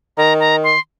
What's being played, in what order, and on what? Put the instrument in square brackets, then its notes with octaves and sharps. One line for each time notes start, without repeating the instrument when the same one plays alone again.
[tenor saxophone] D#3 [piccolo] A#5
[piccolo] A#5
C6